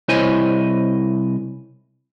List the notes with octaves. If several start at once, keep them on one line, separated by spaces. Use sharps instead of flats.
C2 E4 C5 C#5 D#5 G#5